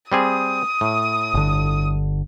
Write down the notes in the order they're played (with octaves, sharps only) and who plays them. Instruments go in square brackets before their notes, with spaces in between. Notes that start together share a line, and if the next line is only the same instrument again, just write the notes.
[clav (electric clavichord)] G3 C4 G#4 [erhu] D#6
[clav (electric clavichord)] A2
[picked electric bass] G1 D3